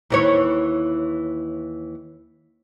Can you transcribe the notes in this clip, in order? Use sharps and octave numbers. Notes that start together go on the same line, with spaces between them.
D#2 E3 C#5